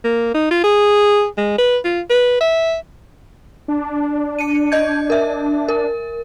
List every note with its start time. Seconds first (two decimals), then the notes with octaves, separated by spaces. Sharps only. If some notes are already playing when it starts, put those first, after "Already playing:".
0.04 A#3
0.34 D#4
0.51 F4
0.64 G#4
1.37 G#3
1.58 B4
1.85 F4
2.10 B4
2.41 E5
3.68 D4
4.39 C#7 D#7
4.72 D#5 G6 G#6
5.10 A#4 E5
5.69 A#4